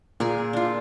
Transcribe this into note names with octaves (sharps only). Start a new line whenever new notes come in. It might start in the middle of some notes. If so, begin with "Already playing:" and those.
A#2 G#4 A#4 G#5
D4 F4